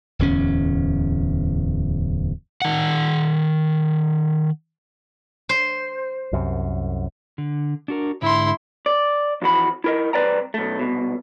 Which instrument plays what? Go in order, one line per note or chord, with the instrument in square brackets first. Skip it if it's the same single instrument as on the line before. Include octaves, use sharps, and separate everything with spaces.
[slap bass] D1 E2 C#4
[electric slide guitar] D#3 F#5
[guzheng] C5
[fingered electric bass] C2 F#2
[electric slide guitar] D3
D4 F#4 A#4
[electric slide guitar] G#2 D3 [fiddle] E4 C6
[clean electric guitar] D5
F2 E3 F#4 B5
E4 A#4 D#5
C2 C4 B4 D5 G5 A#5
B1 A3
C2 B2